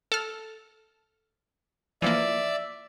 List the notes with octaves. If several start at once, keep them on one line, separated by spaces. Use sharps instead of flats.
A4 F6
E3 F3 A#3 D5 E5